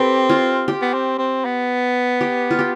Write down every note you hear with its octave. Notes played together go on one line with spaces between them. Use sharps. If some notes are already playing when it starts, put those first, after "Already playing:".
Already playing: C4 G4 A4 B4
F4
G4
B3
C4
C4
B3
G4
F4
G4